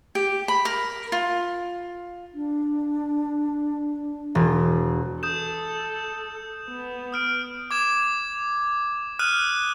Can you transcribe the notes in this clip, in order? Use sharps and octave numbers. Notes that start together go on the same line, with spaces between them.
G4
B5
A#4
F4
D4
E1
A4 D#6 G6 E7
B3
D#6 F6 D7
D6 G#6 E7
D#6 F6 F#6 D#7